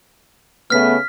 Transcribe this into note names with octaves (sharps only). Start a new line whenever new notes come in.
C#3 A3 B3 F6 B6